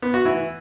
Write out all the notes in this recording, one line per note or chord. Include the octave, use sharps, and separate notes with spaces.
B3
F#4
E3